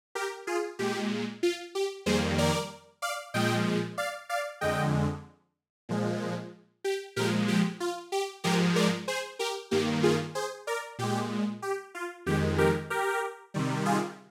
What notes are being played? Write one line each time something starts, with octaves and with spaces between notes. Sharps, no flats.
G4 A#4
F4 G#4
A#2 G#3 G4
F4
G4
F2 D#3 G3 A#3 G#4 C5
A#4 D5
D5 F5
A#2 F3 G#3 D#5 G5
D5 F5
D5 F5
F2 D3 G#3 D#5 G5
A#2 F3 G#3
G4
A#2 F3 G#3 G4 A#4
G4
F4
G4
G#2 F3 G#3 G4 A#4
A#4 D5
G#4 C5
G4 A#4
G2 D#3 A#3 G4
F4 G#4
G#4 C5
A#4 D5
A#2 G#3 G4
G4
F4
F2 D#3 G#3 G4
G4 A#4
G4 A#4
C3 D#3 G3
F4 G#4